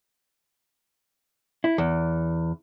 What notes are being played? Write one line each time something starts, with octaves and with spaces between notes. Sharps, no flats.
E4
E2